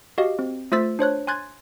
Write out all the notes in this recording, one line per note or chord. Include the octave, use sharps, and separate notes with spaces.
F#4 G4 D#5 F5
C4
A3 F4 C5 E6 A6 B6
D4 C5 C#5 F#6
G#5 C6 F#6 G#6 A6